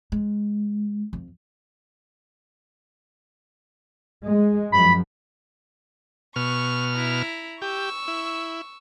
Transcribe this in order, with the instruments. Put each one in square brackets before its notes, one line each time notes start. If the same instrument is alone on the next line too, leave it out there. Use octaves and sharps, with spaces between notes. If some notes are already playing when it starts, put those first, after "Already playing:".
[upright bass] G#3
F2
[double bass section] G#3
[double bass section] F#2 F3 [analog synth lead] B5
[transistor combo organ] B2 F6 [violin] C#6
[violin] E4 A#5
[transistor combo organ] G4 [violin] C#6 E6
[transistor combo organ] E4